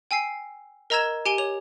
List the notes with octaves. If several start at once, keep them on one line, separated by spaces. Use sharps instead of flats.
G5 G#5 E6 C7
A#4 D#5 A#5 E6 G#6 E7
G4 G#5 D7 G7
G4 C#5 F7